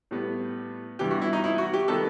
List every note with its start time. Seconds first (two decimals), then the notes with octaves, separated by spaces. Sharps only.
0.11 A2 G3 B3
0.99 G2 E3 B3 G4
1.11 F#4
1.22 E4
1.33 D#4
1.44 E4
1.58 F#4
1.73 G4
1.88 D#3 G3 B3 A4